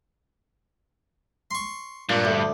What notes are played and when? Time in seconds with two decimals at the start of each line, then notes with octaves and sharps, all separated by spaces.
1.51 C6 C#6
2.09 G2 A#2
2.25 D2